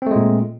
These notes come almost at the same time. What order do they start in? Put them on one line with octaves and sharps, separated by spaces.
C4 A3 G#3 A#2